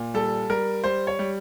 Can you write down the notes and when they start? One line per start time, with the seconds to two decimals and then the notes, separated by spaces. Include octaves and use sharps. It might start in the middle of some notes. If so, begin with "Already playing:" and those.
Already playing: A#2
0.14 G3 A4
0.50 G3 A#4
0.84 G3 C5
1.07 C#5
1.19 G3